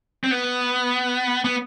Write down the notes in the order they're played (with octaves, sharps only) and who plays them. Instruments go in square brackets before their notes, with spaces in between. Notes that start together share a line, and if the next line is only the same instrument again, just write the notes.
[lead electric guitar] C4
B3
B3